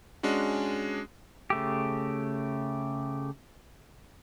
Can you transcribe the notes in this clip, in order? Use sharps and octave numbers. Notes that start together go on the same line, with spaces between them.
G#3 C#4 D4 F#4
C#3 A3 G4